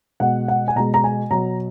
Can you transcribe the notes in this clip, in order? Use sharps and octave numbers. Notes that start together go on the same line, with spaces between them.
B2 G#3 F#5
F#5
G#5
B2 G#3 A#5
A#5
G#5
B2 F#3 A#5